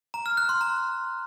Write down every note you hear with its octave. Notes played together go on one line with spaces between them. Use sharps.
A#5
F6
F#6
C6
A#5